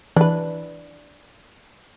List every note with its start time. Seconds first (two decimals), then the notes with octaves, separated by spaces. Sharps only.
0.16 E3 D4 B4